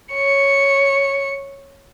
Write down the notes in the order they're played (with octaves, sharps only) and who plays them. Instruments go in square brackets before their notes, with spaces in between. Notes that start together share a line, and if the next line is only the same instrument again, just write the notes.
[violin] C#5 C#7